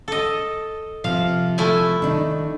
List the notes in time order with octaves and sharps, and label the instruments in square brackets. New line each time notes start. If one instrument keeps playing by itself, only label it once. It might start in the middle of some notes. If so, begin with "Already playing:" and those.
[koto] A4 D#5
[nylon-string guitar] C3 F3 [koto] F5
[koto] A3 E4 G#5
[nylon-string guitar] D#3 D4 D#4